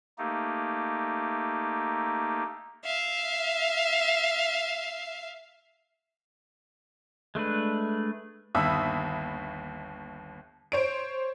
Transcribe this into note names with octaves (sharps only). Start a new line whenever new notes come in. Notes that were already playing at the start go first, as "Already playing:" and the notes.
A3 A#3 D#4 G4
E5 F5
G#3 A3 D4 B4
G1 D#2 E5 B5 D#6
C5 C#5 D7